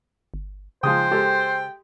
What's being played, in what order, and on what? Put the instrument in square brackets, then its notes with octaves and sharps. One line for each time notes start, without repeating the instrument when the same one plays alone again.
[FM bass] G1
[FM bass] C#3 [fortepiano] F3 G#3 D#6 [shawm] C5 [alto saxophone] G5
[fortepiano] G#3 G4 A4